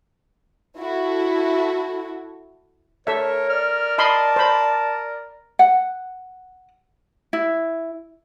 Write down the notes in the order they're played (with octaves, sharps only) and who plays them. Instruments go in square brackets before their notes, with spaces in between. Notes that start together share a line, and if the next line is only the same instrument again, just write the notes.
[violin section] E4 F#4 A4
[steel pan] A4 E5 [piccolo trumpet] A#4 [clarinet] C#5
[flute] D5 [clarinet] F6
[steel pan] D#5 B5 C6 [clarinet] A5
[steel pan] C5 B5
[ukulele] F#5
E4